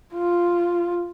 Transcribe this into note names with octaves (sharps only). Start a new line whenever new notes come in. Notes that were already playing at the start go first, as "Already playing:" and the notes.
F4